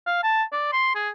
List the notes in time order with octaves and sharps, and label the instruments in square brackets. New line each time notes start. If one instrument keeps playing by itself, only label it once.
[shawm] F5
A5
D5
C6
G#4